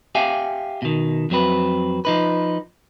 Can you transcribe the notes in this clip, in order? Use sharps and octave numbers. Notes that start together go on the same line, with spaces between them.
G4 E5 F5 G5 G#5
B2 D#3
F2 F#3 C4 B4
F3 D#4 B4